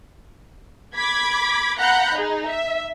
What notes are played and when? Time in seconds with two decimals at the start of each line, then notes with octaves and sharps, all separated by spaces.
0.95 B5 D6 G#6 B6
1.78 F5 F#5 A#5 B5 F#6 G6
2.15 D#4 G#4
2.46 E5